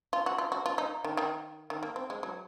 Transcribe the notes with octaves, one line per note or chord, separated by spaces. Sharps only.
F4
F#4
F4
F#4
F4
D#4
D#3
D#3
D#3
A#3
C4
G#3
F#3